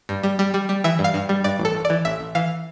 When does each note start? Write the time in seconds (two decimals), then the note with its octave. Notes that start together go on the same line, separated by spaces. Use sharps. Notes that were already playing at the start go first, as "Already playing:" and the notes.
0.09 G2
0.23 G3
0.39 G3
0.54 G3
0.69 G3
0.84 E3 E5
0.99 G2
1.04 F5
1.14 G2
1.29 G3
1.44 G2 D5
1.59 A1
1.65 A4
1.75 A1
1.85 D5
1.90 E3
2.05 A1 E5
2.20 A1
2.35 E3 F5